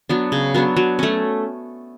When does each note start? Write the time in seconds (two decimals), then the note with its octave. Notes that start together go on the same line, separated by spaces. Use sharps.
0.09 F#3 B3 D4
0.32 C#3
0.55 F#3 B3 D4
0.77 F#3
0.99 A3 C#4